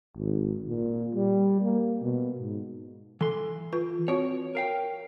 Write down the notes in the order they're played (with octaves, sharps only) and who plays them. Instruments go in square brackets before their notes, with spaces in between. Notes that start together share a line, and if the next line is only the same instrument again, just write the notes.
[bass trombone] G#1
A#2
G3
A#3
B2
G#2
[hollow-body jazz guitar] E3 C6 [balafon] A4
[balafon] F4 B4
[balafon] C4 F#4 [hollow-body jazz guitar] C#5
[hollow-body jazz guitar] A#4 F5 G5